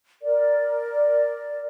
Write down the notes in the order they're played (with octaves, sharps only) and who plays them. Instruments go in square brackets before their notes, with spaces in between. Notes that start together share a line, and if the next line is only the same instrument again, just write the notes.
[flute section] A#4 D5